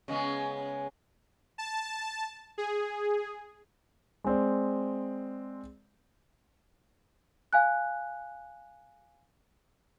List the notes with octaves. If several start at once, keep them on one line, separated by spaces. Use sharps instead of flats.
C#3 G#3 B3
A5
G#4
G#3 C4 D5
F5 G#5 F#6